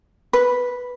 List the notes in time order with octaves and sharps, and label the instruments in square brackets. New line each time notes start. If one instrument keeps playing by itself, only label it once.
[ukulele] B4